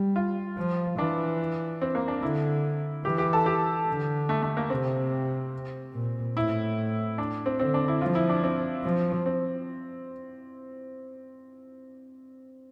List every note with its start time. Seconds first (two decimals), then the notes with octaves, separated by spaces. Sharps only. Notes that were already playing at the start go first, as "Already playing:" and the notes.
Already playing: G3
0.16 F4
0.57 F3
0.98 E3 D4
1.82 C4
1.95 A#3
2.08 D4
2.22 D3 E4
3.05 E3 G4
3.18 G4
3.33 A4
3.46 G4
3.88 D3
4.29 A3
4.43 A3
4.57 A#3
4.70 C3 C4
5.94 A#2
6.35 A2 E4
7.18 D4
7.46 C4
7.60 D3 C4
7.74 D4
7.88 E4
8.01 F3 F4
8.15 E4
8.29 D4
8.43 C4
8.84 F3
9.26 C4